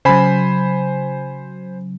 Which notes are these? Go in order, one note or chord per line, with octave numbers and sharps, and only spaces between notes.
C#3 F#3 C5 G#5 B5